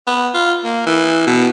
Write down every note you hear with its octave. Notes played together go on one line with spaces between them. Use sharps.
B3
F4
A#3
E3
B2